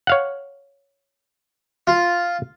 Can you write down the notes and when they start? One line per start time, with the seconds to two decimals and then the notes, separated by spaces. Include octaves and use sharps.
0.07 C#5 F5 F#5
1.87 F4